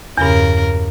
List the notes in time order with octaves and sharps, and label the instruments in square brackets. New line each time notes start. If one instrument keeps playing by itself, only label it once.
[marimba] E2 G2 [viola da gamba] C#3 A#4